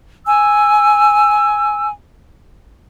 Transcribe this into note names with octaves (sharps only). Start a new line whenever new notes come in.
G#5 E6